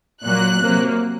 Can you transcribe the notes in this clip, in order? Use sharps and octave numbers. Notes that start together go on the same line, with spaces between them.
A#2 F#3 A#3 F#6
C3 F#3 A#3